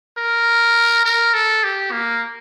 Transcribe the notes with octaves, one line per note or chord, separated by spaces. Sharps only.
A#4
A#4
A4
G4
A#3